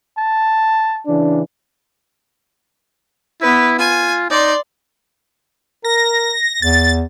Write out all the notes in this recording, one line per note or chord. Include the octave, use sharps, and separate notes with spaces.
A5
C#3 E3 D4
B3 E4 B4
F4 G#5
D#4 D5 C6
A#4 A#6
E2 A6